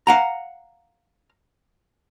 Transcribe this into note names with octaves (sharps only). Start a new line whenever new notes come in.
F5 F#5 A#5